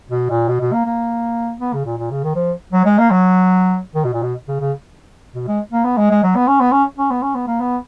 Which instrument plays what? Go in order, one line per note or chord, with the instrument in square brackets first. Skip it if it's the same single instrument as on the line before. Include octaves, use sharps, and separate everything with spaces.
[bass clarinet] B2
A#2
B2
B2
A#3
A#3
B3
C#3
A#2
A#2
C#3
D#3
F3
F#3
G#3
A#3
F#3
D#3
B2
A#2
B2
C#3
C#3
B2
G#3
A#3
B3
G#3
G#3
F#3
B3
C#4
B3
C#4
C#4
B3
C#4
B3
A#3
B3